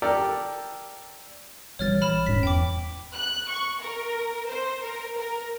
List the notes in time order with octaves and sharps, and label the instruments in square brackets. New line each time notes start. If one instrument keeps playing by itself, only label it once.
[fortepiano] G4 A4 A#4 D5
[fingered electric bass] A#1 E3 G3 [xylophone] C#5 F6 A6
[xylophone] B5 F6 E7
[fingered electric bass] D#1 G#2 C#4 [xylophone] B6
[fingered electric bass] E2 [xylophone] G5 D6
[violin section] F#6
C#6
A#4
C5
A#4
A#4